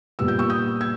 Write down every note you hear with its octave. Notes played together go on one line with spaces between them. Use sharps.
A#2 G3 B3 E6
G6
C#6 E6
D#6 G6
E6 G#6